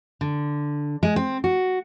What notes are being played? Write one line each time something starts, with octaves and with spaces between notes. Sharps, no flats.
D3
G#3
C4
F#4